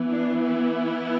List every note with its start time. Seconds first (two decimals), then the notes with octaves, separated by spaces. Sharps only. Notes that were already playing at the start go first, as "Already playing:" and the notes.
Already playing: E3 B3
0.10 D4
0.40 E4